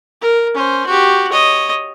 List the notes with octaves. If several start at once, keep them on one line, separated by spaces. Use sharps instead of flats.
A#4
C#4 C5
F#4 G4
C#5 D#5